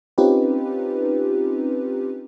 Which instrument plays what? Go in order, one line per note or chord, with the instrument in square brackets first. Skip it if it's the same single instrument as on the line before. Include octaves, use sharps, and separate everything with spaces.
[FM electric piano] C4 C#4 D#4 F4 G4 B4